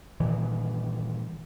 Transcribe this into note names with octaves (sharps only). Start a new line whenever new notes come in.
G2 A#2 D#3 E3